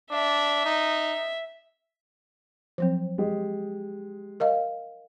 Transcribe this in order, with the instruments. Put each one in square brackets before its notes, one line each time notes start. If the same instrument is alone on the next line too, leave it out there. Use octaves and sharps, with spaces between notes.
[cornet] D4 [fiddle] E5
[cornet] D#4
[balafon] F3 F#3 C4
[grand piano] G#3 G4
[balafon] A#4 D#5 F5